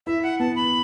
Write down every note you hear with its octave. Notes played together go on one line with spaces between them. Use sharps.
E4 E5
F#5
B3 A5
B5